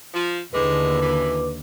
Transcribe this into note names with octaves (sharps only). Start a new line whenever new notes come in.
F3
D#2 A2 D3 E3 G#3 B4 D6
F#2 E3